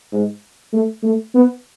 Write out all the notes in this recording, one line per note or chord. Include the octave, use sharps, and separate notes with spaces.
G#2
A3
A3
B3